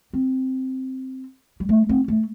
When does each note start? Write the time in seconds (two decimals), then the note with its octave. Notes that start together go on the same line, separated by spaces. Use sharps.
0.13 C4
1.60 G3
1.69 A3
1.89 C4
2.08 A3